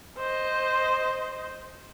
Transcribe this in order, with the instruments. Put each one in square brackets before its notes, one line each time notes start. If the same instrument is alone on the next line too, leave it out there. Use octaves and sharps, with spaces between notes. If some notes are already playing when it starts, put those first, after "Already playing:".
[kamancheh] C5 D#5